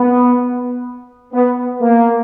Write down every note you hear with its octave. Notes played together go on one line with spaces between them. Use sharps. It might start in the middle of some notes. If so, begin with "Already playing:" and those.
Already playing: B3
B3
A#3